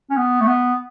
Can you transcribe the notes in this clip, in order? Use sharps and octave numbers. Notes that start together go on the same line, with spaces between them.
C#4
B3
A3
B3